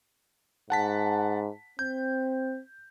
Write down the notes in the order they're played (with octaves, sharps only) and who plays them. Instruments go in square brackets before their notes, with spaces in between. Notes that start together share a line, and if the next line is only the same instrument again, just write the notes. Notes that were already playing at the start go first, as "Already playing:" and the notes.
[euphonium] G#2 [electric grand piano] F#5 A5 B6
[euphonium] C4 [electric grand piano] G6